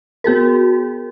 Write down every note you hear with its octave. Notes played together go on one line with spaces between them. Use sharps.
B3 F#4 G#4 A#4